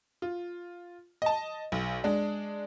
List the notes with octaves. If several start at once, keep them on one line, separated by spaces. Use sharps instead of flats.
F4
D#5 A5
B1
G#3 D4